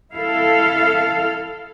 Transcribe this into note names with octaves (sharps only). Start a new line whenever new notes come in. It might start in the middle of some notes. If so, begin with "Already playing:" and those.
E4 A4 F5